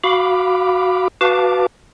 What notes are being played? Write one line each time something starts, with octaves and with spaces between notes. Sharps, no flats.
F#4 F5 B5 D6
F#4 B4 F5 A5 D6